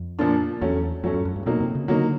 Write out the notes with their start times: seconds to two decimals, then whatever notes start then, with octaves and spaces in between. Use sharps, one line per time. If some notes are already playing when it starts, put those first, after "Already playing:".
Already playing: F2
0.19 A#2 F3 A#3 D4 F4
0.61 E2 F#3 A3 C#4
1.04 F2 F#3 A3 C#4
1.14 F#2
1.25 F#2
1.36 G2
1.46 B2 F#3 A#3 D#4
1.60 C3
1.75 C#3
1.88 D3 F#3 A#3 D#4